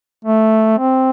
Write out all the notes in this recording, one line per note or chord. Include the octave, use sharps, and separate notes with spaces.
A3
C4